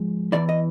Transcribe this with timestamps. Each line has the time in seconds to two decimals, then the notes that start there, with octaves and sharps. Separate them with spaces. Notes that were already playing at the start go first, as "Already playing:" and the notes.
Already playing: G#2 F3 G#3
0.32 E2 C#3 E3 D5
0.49 D#5